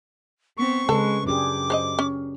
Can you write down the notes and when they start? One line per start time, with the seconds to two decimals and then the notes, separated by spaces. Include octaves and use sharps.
0.58 B3 C4 C#6
0.89 C#3 G#3 A4 B4
1.27 F#2 D4 G4 G#4 D6
1.70 C5 C#5 D#5
1.99 C#4